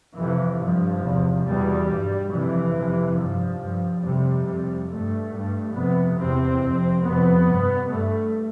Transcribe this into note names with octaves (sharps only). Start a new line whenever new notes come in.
F2 C3 E3
G2 F3
E2 C3
E2 B2 G3
G2
F2 C3 E3
F2 C3
G2 F3
G2
F2 C3 G3
F2 C3
G2 A3
G2
F2 C3 B3
E2 C3 C4
F2 C3
F2 C3 B3
G2
G2 A3